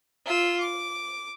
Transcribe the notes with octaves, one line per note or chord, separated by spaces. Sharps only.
F4 E6
D6